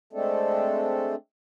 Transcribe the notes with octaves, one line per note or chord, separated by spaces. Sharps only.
G#3 A3 C4 D4 A4